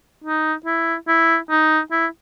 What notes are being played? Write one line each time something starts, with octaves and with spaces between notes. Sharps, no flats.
D#4
E4
E4
D#4
E4